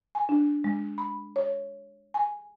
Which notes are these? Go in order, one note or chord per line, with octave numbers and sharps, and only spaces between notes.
G#5
D4
G#3
B5
C#5
G#5